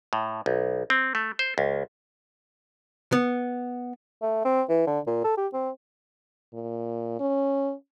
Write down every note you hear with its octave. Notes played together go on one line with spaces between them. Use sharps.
A2
B1
C4
A3
C5
C#2
B3
A3
C4
E3
D3
A#2
A4
G4
C4
A#2
C#4